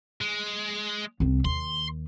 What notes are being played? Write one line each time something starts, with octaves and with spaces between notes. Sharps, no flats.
G#3
C2 C4
D#2 C6